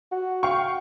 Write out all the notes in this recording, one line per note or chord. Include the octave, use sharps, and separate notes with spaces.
F#4
F5 G5 C#6